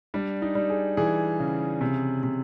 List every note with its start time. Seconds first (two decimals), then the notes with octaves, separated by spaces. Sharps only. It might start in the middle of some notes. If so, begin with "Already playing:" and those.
0.14 G3 D4
0.42 D#4
0.55 G3
0.70 G#4
0.97 E3 G#4
1.40 C#3
1.81 C3
2.23 C3